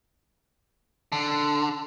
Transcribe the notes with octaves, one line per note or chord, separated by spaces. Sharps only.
D3